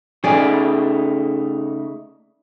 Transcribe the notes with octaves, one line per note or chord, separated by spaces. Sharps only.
C#3 A3 D#4 G#4 D5